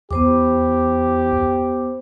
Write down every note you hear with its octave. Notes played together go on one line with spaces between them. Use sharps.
E2 B3 G4 C5 D6